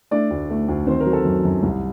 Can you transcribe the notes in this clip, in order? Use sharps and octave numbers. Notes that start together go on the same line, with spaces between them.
A3 D4 D5
D2
A3
D2
D#3 C4 C5
A#4
F#3
A4
F#2
F#2
C2